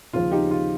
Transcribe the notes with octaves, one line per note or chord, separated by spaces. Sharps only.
D#2 C#3 F3 G#3 F4
D#4 G4
F4